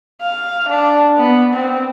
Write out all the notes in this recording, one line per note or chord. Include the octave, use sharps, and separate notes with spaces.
F5
D4
B3
C4